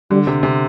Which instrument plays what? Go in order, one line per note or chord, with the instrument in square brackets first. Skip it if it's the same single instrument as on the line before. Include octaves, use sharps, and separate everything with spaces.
[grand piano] D3 [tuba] G3
[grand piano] C3
C3